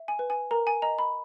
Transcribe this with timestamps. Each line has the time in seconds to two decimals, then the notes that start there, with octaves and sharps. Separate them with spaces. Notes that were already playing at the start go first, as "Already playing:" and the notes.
Already playing: E5
0.08 G#5
0.19 B4
0.30 G#5
0.51 A#4 A#5
0.67 G#5
0.82 D#5 A#5
0.99 B5